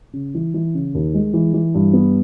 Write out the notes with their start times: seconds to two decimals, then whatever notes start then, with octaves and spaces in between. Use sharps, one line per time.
0.13 C#3
0.34 E3
0.54 E3
0.74 C#3
0.94 D#2
1.14 G#3
1.34 E3
1.54 E3
1.74 G2
1.93 B3